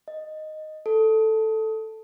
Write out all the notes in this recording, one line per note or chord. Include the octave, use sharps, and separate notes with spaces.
D#5
A4